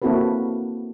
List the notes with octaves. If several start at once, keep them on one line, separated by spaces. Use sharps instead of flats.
A#3 C4 E4 F#4 A4 B4